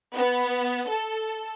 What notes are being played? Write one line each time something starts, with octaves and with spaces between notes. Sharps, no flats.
B3
A4